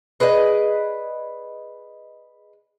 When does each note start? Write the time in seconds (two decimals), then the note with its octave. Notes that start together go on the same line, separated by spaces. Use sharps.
0.20 G#4 B4 D5 D#5